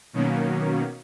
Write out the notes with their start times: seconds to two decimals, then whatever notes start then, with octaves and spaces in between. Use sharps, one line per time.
0.13 B2 D#3 F#3 A#3 C#4